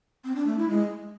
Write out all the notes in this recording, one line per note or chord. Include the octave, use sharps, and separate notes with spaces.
C4
D4
A3
E4
G#3